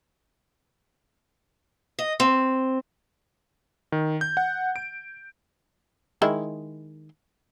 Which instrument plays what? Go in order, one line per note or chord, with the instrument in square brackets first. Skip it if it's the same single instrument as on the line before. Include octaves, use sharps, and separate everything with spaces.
[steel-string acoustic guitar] D#5
C4
[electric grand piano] D#3
G6
F#5
D7
[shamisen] D#3 G#3 E4